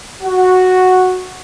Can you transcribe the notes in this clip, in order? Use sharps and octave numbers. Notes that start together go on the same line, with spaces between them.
F#4